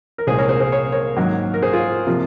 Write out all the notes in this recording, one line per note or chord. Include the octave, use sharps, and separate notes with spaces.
A#4
C2 A#2 G#3 G#4 C5
A#4 C#5
G#4 C5
G#4 C5
C#5
A#4 C#5
G#2 D#3 F#3 A#3
A#4
G#4 C5
F4 G#4
C3 F3 A#3 F4